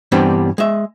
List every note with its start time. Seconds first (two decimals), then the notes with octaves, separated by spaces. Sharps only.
0.12 G2 E3 G3 B3 C4 D4
0.58 G#3 E5